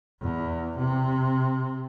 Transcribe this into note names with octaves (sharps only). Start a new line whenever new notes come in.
E2
C3